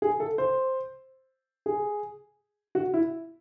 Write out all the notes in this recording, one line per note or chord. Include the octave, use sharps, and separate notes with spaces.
G#4
A4
C5
G#4
F#4
E4